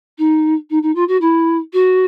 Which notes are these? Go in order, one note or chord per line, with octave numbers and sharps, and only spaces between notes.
D#4
D#4
D#4
F4
F#4
E4
F#4